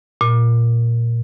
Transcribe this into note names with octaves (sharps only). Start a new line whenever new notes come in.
A#2